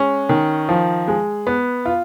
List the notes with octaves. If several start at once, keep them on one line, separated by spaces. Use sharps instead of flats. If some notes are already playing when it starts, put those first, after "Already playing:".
Already playing: G#3 C#4
D#3
F3
G#3
B3
F4